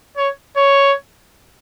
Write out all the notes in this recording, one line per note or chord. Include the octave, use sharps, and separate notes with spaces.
C#5
C#5